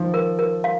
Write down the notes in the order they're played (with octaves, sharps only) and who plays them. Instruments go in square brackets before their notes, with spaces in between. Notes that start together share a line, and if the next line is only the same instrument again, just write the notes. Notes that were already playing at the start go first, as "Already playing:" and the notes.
Already playing: [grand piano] D#3 F3
[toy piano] A#4
A#4
F5